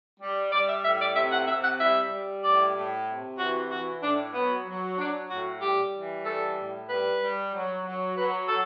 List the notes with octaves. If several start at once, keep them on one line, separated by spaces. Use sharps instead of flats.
G3
G3 D5
E5
A2 E5
D5
C3 E5
F#5
C3 E5
F#5
G3 E5
G3
A2 D5
A2
C3
E3 F#4
E3 F#4
A2 D4
F#3 B3
F#3
F#3 D4
A2 F#4
G3 G4
E3
G3 A4
A2
G3 B4
G3
F#3
F#3
F#3 B4
F#3 A4